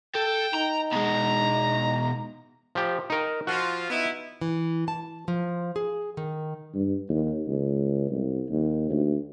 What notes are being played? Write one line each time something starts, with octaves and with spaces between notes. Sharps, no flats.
A4 G5
D#4 A#5
B2 G#3 A#5
F3 G4
D#4 A#4
F3 F4 F#4
B3 D#4 E4
E3
A5
F3
G#4
D#3
G2
D#2
C#2
C2
D#2
D2